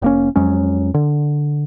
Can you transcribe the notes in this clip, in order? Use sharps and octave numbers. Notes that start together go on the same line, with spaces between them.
F1 A#3 C#4
F2 F#3 G#3 C#4
D3